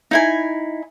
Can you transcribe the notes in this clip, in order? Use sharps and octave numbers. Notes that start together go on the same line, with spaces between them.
D#4 E4 G#5